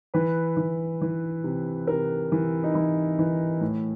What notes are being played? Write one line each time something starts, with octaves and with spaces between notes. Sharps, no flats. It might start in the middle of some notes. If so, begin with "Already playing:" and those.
E3 B4
E3
E3
C3
C3 A#4
E3
D#4
E3 E4
E3
A2